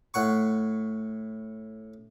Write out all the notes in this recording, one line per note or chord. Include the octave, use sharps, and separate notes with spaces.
A2 F#5 C#6